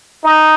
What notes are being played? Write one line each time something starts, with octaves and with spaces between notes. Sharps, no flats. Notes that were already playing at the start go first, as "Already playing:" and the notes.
D#4